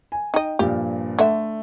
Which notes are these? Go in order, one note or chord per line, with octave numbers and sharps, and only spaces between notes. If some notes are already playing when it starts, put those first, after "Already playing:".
G#5
D#4 D#5 G5
G2 A#2 F3 G4
D3 A3 E5